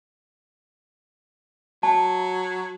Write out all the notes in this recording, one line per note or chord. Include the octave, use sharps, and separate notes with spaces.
F#3 A5